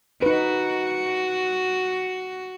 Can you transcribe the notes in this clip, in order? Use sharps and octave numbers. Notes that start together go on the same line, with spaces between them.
D#4 F#4 B4